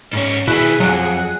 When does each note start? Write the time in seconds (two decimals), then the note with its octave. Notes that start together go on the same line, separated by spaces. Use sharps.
0.13 G#2 C#4
0.48 B2 D#3 E4 G#4 B4
0.80 B1 F2 F#3 F#5